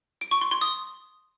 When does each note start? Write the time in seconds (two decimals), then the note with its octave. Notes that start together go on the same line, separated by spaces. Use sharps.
0.21 D7
0.31 C#6
0.41 C6
0.51 C6
0.61 D#6